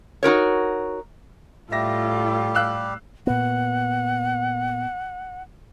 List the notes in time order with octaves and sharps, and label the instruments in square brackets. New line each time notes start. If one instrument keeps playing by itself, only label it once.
[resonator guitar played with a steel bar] D#4 F#4 A#4 C#5
[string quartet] A2 [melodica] G3 G4 [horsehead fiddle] F4 A4 [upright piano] E5 A#6
[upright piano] F5 E6 F#6
[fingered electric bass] A#2 B3 [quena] F#5